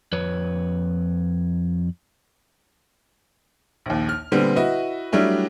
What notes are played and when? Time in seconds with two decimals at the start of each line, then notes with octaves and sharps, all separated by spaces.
0.12 F2 B4 C#5
3.86 A#1 D#2
4.09 F6
4.32 A#2 D3 G3 B3 C4
4.56 E4 F#4 B4 D#5
5.12 F#3 G3 A3 D4 E4